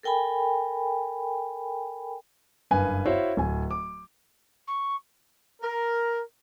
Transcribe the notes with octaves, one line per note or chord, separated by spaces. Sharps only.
A4 A#4 G5 G#5 B5
F#1 G2 B4 F5 G#5
E4 F#4 C5 C#5 F5
D1 G#5
D6
C#6
A#4